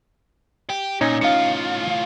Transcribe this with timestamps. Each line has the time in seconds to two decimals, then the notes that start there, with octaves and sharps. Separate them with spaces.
0.70 G4
1.01 A#2 C#4 D#4
1.21 A2 F4 F5 C#7